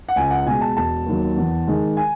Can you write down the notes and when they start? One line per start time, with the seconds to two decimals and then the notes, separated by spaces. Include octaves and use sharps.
0.09 F#5
0.16 C#2 G#5
0.31 F#5
0.46 B2 G#3 G#5
0.61 A5
0.77 E1 A5
1.06 D#2 D#3 F#3
1.37 E2
1.67 D#3 G#3
1.97 G#5